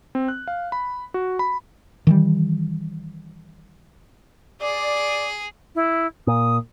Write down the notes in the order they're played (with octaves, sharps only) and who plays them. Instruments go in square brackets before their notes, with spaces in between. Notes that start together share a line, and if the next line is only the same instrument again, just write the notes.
[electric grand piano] C4
F#6
F5
B5
F#4
B5
[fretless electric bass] D#3 E3 G3
[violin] G#4 [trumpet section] D5
[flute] E4
[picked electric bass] A#2 [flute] D#6